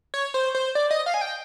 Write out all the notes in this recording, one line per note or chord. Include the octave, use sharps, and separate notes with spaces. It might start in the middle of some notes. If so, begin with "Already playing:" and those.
C#5
C5
C5
D5
D#5
F5
G#5
G5